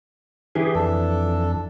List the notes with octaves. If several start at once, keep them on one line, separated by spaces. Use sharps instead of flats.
E3 G4 G#4
F2 D4 A4